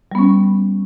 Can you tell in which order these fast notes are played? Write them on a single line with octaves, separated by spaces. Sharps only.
G3 B3 C#4